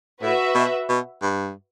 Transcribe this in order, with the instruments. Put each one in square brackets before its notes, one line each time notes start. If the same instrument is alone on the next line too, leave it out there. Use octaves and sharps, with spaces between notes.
[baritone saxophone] A2 [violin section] F#4 B4 E5
[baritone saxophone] B2
B2
G2